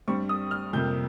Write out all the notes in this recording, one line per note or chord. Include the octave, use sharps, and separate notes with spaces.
G2 G3 C4 C#6
D#6
F6
F2 C3 G3 A#3 G6